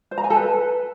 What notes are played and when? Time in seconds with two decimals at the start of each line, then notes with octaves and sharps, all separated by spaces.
0.11 C5
0.18 A#5
0.24 G#5
0.30 A4
0.36 B4